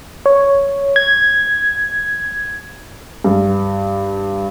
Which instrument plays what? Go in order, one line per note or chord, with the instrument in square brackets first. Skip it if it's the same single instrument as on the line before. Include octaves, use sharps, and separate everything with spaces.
[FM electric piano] C#5
G#6
[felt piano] G2